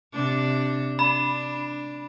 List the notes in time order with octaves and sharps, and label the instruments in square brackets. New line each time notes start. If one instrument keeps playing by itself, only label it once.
[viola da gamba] C3 D4
[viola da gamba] D4 [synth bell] B5